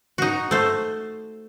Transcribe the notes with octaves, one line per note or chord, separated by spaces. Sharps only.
D#4 F#4
A3 C5